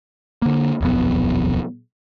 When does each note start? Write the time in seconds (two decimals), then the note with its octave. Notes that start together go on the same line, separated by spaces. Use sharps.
0.42 D3 A#3
0.81 D#1 B1 F2 B3